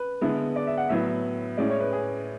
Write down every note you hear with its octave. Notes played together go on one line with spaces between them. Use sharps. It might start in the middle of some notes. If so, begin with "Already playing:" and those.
Already playing: B4
D3 G#3 B3 E4
D5
E5
F#5
A2 F#3 B3 E4 E5
A2 G#3 C#4 E4 D5
C#5
B4
G#4